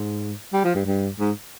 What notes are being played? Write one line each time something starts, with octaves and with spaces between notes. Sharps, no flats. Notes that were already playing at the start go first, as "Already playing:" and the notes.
Already playing: G#2
G3
F3
G2
G2
G#2